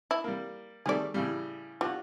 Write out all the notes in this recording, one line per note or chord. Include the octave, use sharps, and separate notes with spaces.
E4
G3 A#3
D#3 G3 A3 G#4 D5
A2 C#3 G3
G3 F4 F#4